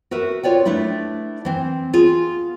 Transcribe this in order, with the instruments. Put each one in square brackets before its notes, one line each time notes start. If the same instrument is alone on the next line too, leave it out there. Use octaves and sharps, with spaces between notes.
[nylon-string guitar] F#4 A#4 B4 E5
F4 C#5 D5 G5
A3 D4 E4 B4
E3 C4
B3 F4 G#4